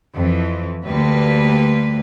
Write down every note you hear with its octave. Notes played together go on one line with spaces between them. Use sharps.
F2 E3
D2 G3 A#3 B4